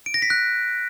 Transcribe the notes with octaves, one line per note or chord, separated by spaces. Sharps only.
D7
A#6
B6
F#6